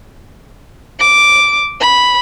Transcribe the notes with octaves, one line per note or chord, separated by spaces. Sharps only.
D6
B5